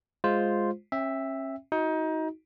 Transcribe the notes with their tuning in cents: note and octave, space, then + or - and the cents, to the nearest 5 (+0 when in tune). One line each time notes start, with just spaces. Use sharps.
G#3 +0 F4 +0 C5 +0
C#4 -40 E5 +0 G5 +20
D#4 +25 F#4 +0